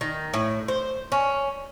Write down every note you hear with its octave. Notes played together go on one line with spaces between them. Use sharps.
D#3
A2
C5
C#4